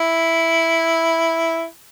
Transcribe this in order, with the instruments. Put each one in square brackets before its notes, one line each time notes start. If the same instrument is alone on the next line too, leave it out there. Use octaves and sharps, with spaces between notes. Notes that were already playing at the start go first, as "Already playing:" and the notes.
Already playing: [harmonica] E4